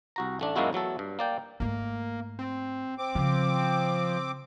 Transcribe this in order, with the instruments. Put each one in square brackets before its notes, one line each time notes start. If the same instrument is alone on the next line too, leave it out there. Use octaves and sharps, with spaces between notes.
[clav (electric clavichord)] C2 F#4 A#5
A1 A3 D4
F#2 A#2 G#3 A#3 E4 F#4
E2 F#3 A3 A4
G2
A#3 D5 G5
[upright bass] G#2 A3 [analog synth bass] A#3
[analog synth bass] C4
[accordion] C4 D6
[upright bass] C#3 [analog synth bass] F3